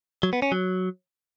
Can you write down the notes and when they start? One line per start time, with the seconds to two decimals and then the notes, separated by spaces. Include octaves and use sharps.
0.23 F#3
0.33 B3
0.42 C#4
0.52 F#3